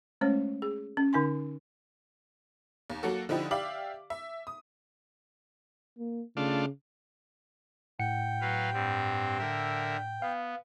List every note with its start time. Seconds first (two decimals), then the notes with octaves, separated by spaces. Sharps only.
0.21 G#3 A3 C#4 C5 C#5
0.62 G#4
0.97 C#4
1.13 D3 D#4 G#5 C6
2.90 D#2
3.03 F#3 A#3 F#4 A4
3.29 D3 F3 D#4 E4 G4
3.51 G4 D5 E5 F5 D6 F#7
4.10 E5
4.47 D#6
5.98 A#3
6.37 C#3 A3 D4 F4
7.99 A2 F#5 G5 C#7
8.41 F#3 B4 F5
8.73 G2 G3 C4
9.38 D3 A#4 E5
10.22 B3 F5